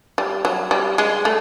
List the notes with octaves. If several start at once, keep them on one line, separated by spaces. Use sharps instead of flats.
G3
F#3
G3
G#3
A3